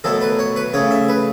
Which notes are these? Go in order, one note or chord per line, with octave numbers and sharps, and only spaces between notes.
B2 F#3 A3 A4
B4
C#5
B4
C#3 A3 C#5
E5
B4